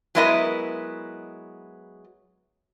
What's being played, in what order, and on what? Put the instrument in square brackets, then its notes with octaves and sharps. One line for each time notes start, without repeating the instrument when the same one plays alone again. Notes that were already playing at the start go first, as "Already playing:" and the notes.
[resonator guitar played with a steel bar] F#3 G#3 B3 E4 A#4 D#5